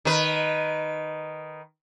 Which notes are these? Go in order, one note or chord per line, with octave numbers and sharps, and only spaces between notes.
D#3 B4